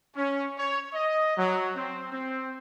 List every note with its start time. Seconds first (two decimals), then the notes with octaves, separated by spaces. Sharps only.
0.16 C#4
0.59 C#5
0.94 D#5
1.38 F#3
1.76 C4
2.13 C4